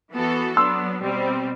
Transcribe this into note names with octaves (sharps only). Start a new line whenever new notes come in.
E3 B3 F#4 A4
F#3 B3 D4 C6 E6
B2 G3 C4